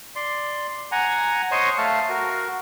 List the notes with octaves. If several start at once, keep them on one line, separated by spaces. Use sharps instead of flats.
D5 C6
F#5 G#5 A#5
C5 C#5 D#5 C#6
A3 F5 A5
F#4 A#4